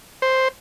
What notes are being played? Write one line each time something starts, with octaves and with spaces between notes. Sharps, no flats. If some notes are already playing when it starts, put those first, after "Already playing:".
C5